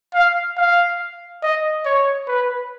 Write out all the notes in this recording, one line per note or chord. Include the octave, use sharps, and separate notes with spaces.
F5
F5
D#5
C#5
B4